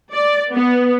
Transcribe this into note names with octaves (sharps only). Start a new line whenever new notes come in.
D5
B3